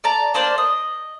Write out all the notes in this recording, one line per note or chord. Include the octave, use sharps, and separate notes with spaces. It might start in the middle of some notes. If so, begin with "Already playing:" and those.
D5 A5 A#5
A#3 D4 C5 D5
D#5